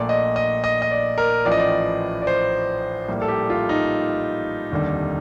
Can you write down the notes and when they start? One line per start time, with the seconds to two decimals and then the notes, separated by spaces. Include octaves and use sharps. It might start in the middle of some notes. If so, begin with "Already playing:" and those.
Already playing: A#1 A#2 A3 D5
0.09 D#5
0.36 D#5
0.64 D#5
0.82 D#5
0.91 D5
1.18 A#4
1.45 A1 A2 F3 D5
1.52 D#5
1.59 D5
2.22 D5
2.27 C5
3.08 A#1 A2 G3 A#3
3.22 A4
3.28 G4
3.50 F4
3.69 D#4
4.72 F1 D#2 D3 G3